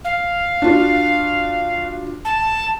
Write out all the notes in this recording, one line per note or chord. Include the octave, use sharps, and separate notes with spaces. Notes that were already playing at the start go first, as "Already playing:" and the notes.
F5
D4 F4 F#4
A5